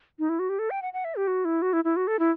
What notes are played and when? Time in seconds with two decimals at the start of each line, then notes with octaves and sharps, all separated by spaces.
0.19 D#4
0.29 E4
0.39 F#4
0.49 G4
0.59 A4
0.70 G5
0.82 F#5
0.93 F#5
1.05 E5
1.16 G4
1.27 F#4
1.45 E4
1.62 F#4
1.73 E4
1.84 E4
1.96 F#4
2.07 A4
2.19 E4